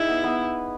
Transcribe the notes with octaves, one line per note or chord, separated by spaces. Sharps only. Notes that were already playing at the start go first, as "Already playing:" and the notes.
Already playing: D#4 E4 G#4
B3
B3